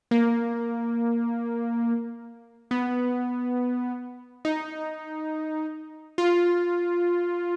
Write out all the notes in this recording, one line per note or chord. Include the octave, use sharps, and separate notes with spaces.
A#3
B3
D#4
F4